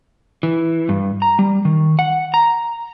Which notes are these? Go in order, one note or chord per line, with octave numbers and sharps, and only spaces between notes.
E3
G2
A#5
G3
D#3
F#5
A#5